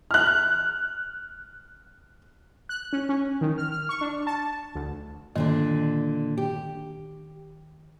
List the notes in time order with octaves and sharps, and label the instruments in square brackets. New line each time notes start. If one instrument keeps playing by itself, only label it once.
[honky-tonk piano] F6 F#6
[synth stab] F#6
C#4
C#4
D#3
F6
F6
C#6
D4
A5
D2
[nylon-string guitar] A#2 D3 D4 [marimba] D#3
[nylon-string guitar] G4